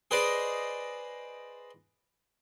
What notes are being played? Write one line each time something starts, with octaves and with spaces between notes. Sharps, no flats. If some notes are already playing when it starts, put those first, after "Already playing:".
G#4 B4 C5 D5 D#5